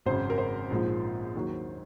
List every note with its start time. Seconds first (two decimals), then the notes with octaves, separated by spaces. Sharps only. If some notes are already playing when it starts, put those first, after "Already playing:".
0.06 G#1 F#2 C#3 C5
0.30 A#4
0.38 C5
0.70 A#1 G#2 F3
1.35 D#2 D#3 F#3